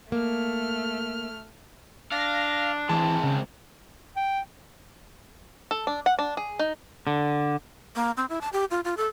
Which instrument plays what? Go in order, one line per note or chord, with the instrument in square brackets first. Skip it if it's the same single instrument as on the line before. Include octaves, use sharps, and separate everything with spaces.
[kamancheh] A3 F6 [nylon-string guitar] A#3
[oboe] D4 [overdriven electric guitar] F5 [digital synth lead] A#6
[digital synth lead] E3 [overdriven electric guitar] G#3 C4 [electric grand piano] A5
[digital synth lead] C#3
[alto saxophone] G5
[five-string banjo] A4
D4
F#5
D4
G#4
D#4
[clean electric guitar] D3
[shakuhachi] A#3
C4
E4
A5
G4
F4
F4
A4